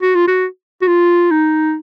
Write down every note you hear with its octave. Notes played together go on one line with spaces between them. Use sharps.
F#4
F4
F#4
F#4
F4
D#4